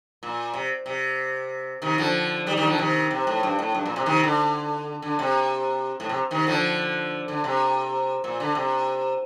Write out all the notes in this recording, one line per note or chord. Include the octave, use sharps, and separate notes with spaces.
A#2
C3
C3
C3 D#3
D3 F3
D#3 G3
D#3 G3
D3 F3
C3 D#3
C3
A2
G2
A2
G2
A#2
C3
C3 D#3
D3
D3
C3
A2
C3
C3 D#3
D3 F3
D3
C3
A#2
D3
C3